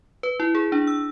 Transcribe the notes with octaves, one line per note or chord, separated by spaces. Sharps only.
B4
E4
G#4
D4
E6